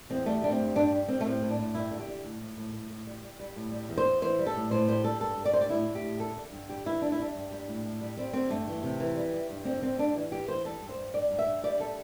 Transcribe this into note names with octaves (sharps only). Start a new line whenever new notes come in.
E2 C4
G3 A3
G3 D4
C4
G2
G2 D4
G3
G3 C4
A3
A2 C4
A2
D4
A2
G2 E4
D3
G4
D3
A2
A2
A2
A2
A2
G3
G3
G3
A2
G3
E2
C5
E2
E3 C5
G3
A4
A2
A2 C5
G3 C5
G3 A4
G2 A4
G2
D5
G3 C5
D5
A2 E4
A2
G4
A2
G3 A4
D3
G2
G3 G4
E3 E4
G3 D4
E4
G3 D4
G2
G3
A2
A2
G3
G3 C4
D3 C4
G2 A3
E3
C3
E3
G3
G3
G2
D3 C4
D3 C4
G3 D4
E3
G3 G4
E3 C5
G3 A4
G2
C5
G2
G2 D5
G2
E5
G2
G3 D5
G3 A4